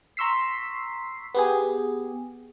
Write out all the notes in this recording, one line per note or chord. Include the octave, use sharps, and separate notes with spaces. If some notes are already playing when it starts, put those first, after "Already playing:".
A#5 C6 C#6 E6 B6 C7
B3 G4 G#4